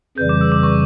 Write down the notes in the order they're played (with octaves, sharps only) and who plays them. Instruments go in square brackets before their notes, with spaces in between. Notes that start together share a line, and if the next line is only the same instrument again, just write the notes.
[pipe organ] F2 C#3 E3 G3 [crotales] G6
[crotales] D6
E6
D6
C#6